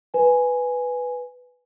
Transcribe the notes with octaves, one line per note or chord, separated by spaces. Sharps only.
B4 G#5